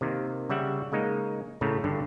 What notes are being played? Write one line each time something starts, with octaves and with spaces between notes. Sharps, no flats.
C3 D#3 A#3
C#3 G3 E5 F#5
C#3 G#3 A#3 D#4
A2 C#3 A3 A#5
G2 D3